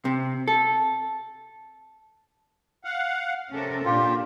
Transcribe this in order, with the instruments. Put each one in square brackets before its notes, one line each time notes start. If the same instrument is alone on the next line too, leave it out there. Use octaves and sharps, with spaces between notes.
[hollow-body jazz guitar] C3
A4
[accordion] F5 F#5
[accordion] C3 [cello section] C#4 A4 A#4
[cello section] A#2 D4 [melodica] F4 [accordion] G4